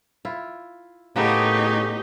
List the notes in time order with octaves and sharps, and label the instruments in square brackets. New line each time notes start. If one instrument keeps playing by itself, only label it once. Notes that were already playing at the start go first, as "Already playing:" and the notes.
[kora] E4 F4
[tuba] A2 [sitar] C#3 [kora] A#3 B3 A4 [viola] D#4 G4